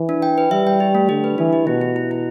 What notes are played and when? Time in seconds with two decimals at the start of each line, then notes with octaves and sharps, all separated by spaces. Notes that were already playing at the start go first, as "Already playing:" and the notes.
Already playing: E3
0.09 D4
0.22 G5
0.38 B4
0.51 G3 E5
0.67 G5
0.80 G4
0.95 A3
1.09 D3 G4
1.24 B4
1.38 E3 D4
1.53 G4
1.67 B2 E4
1.81 E4
1.96 E4
2.11 E4